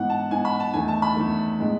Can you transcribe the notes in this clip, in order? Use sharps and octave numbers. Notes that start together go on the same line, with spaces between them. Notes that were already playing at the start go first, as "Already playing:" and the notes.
Already playing: G#2 E3 B3 F#5
A5
G#2 E3 B3 G#5
B5
A5
E2 D#3 A3 G#5
A5
B5
E2 D#3 A3
A2 G#3 B3